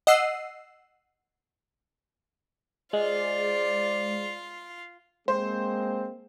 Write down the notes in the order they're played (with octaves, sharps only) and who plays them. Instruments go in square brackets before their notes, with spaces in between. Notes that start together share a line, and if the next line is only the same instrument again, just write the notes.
[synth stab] D#5 F#5 E6 C7
[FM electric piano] G#3 [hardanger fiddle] F4 F5 [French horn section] C5 D5
[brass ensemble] G#3 A#3 C4 [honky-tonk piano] C5